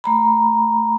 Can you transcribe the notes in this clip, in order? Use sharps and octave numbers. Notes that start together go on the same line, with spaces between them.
A3 A#5 B5